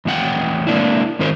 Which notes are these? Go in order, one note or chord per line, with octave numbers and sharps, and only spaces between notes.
E2 A2 F4 F#5 G5
G#3 A#3 D4 E4
G#2 D#3 D#4 A#4 C5